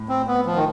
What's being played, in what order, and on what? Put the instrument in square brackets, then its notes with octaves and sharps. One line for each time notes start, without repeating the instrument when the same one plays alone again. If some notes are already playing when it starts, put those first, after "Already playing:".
Already playing: [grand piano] A2
[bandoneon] C4
B3
F3
D#3